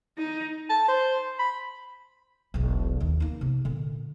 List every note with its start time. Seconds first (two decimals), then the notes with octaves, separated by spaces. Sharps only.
0.18 D#4
0.70 A5
0.88 C5
1.39 B5
2.54 E1 B1
3.00 D#2
3.20 A#3 D#4
3.41 C3
3.65 A#2 D3